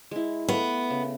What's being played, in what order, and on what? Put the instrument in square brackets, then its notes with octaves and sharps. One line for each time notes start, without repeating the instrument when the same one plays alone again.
[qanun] G#3 E4
[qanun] A3 F5 [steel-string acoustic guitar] B3
[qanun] C#3